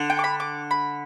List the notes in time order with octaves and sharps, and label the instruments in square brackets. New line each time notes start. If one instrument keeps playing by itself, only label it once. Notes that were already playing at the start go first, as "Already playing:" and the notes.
Already playing: [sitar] D3
[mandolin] G5
D6
B5
D6
B5